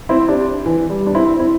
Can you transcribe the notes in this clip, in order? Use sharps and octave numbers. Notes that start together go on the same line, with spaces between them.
C4 E4
D4 G4
E3
G3
D4
C4 E4
C4 E4